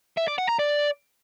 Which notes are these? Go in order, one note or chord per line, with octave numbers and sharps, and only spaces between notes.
E5
D5
F#5
A#5
D5